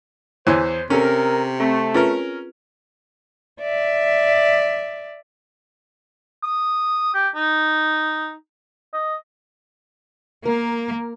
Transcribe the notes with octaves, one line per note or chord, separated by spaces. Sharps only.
E2 E3 C5 C#5 G#5
C3 C#4 A4 A#4
A3 C4
C#4 F4 G#4 A#4 B4
D5 E5
D#6
G4
D#4
D#5
A#3 A#4